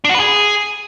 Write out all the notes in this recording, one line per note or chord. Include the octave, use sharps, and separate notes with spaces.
D4
F#4
B4
G#4